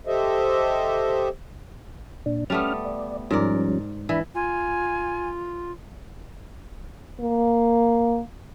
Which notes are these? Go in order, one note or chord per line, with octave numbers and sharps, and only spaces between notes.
G4 A4 C5 D#5 E5
A#2 D4
G3 A3 B3 C#4 F6
D5
G#2 F3 G3 C#4 A#4 D5
E3 D4 E5 B5
F4 G#5
A#3